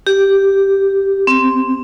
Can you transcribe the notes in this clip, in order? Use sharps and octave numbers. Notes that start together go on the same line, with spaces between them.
G4
C4